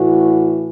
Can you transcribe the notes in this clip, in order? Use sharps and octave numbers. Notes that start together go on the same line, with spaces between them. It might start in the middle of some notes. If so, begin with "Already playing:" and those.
Already playing: A2 E3 F#4